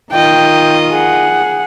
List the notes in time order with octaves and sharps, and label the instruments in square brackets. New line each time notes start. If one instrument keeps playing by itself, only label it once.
[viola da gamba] D#3 F4 D#5 [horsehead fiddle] G5
[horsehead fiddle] G#4 F#5